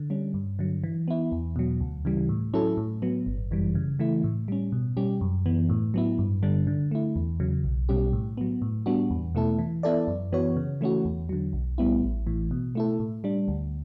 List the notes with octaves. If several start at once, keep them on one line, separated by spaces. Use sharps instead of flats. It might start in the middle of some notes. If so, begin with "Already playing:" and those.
Already playing: D3
G3 C#4
G2
D3 F#3
E3
B3 E4
E2
B2 F#3
D2
C#3 E3 G3
A2
F#3 C#4 E4 A4
A2
F#3 B3
G1
F#2 E3 G3
C#3
E3 A3 E4
A2
G3 C#4
B2
G3 C#4 G4
F#2
E3 B3
A2
F#3 B3 E4
G2
D3 G3 D4
D3
A3 E4
E2
C#3 F#3
B1
B2 G3 C#4 G4
A2
F#3 B3
A2
G3 B3 D4 F#4
E2
B2 A3 E4 A4
E3
B3 E4 A4 D5
F#2
E3 B3 F#4 C#5
C#3
E3 A3 C#4 F#4
E2
D3 F#3
B1
A2 G3 B3 E4
A1
A2 E3
B2
A3 E4 A4
A2
G3 D4
D2